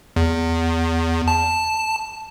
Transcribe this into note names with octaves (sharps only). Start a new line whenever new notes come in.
E2
A5